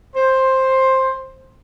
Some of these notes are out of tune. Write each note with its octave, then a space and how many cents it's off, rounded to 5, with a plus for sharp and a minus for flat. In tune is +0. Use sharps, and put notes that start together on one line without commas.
C5 +10